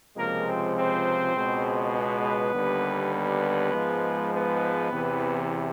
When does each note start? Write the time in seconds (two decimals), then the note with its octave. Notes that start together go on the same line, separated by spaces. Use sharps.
0.17 C#2 C3 F3 G#3 A#3 A#4
0.46 C4 C5
0.76 C4 C5
1.36 C#2 B2 G#3
1.94 B3 B4
2.55 D#2 D3 G3
3.14 B3 B4
3.72 G#2 F3 G#3
4.32 B3 B4
4.91 E2 C3 E3